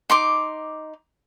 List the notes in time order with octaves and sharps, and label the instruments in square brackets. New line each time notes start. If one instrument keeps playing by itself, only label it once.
[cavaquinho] D#4 C6 D6